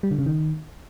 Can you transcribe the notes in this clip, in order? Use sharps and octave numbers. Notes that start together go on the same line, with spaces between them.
G3
D3
C#3
D#3